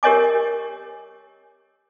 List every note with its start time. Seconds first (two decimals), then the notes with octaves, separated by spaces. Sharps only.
0.03 G4 A#4 C#5 D#5 G#5 D6